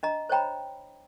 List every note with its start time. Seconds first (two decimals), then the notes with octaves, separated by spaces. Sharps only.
0.03 D4 D#5 A#5
0.29 C5 C#5 D#5 G5 A#5 B5